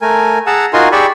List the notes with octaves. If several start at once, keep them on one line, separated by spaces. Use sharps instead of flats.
A3 A#4 G#5
G#4 F#5 A5 A#5 E6
D#4 F4 F#4 A#4 G#5 C6
G4 G#4 D5 B5 C#6 E6